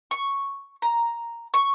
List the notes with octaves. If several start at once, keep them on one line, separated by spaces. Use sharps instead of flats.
C#6
A#5
C#6